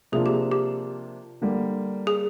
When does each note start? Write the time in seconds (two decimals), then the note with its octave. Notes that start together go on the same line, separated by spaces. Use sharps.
0.12 C3 F3 A#3 D4 F4 G#4
0.26 G4
0.52 G4
1.41 D3 G3 A#3
2.07 G#4